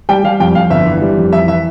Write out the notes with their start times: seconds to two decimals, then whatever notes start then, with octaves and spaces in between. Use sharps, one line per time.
0.09 G3 G5
0.23 G3 F5
0.40 F2 G5
0.54 F2 F5
0.70 G1 E5
0.86 E3
1.02 G3
1.17 F2
1.32 E3 E5
1.48 E3 E5